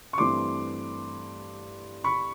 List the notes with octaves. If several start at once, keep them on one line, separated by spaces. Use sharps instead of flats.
C#6
G2 E3 A3 C4 C6 D6
B5 C#6